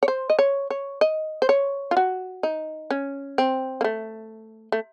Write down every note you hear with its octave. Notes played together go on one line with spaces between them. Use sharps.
C#5
C5
D#5
C#5
C#5
D#5
C5
C#5
F4
F#4
D#4
C#4
C4
A#3
A3
A3